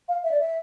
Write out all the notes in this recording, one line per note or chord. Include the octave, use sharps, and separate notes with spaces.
F5
E5
D5
E5